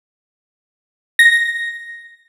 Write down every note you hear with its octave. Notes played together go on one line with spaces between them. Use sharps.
A#6